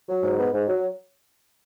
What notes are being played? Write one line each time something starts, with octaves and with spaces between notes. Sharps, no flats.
F#3
G#2
B3
G#2
F#3